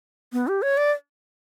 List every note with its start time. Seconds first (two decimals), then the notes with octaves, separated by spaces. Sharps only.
0.33 B3
0.48 G4
0.62 C#5
0.77 D5